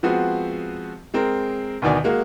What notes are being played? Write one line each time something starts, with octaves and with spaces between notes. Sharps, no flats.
F3 G#3 B3 C4 F#4
G#3 C4 A#4
D2 B2 D#3 D5 G#5
G#3 A#3 F#4